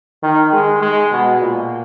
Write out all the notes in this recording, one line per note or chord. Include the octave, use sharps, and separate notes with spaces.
D#3
G#3
G#3
B2
A#2